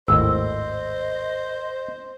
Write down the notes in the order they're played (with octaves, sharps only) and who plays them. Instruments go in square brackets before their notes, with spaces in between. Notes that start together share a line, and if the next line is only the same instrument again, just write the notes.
[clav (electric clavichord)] G#1 D#2 A2 [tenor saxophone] C5 [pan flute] D#5 [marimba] E6